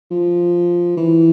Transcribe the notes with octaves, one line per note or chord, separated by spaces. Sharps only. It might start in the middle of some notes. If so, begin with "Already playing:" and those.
F3
E3